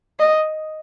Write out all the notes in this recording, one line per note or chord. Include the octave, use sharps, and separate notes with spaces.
D#5